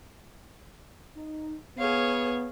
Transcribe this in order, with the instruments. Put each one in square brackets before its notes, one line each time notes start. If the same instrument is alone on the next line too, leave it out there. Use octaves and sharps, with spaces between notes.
[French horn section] D#4
[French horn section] B3 [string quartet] G#4 C#5 F5